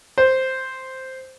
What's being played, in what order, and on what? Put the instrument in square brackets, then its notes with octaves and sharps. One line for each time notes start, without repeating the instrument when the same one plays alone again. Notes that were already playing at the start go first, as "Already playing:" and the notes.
[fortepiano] C5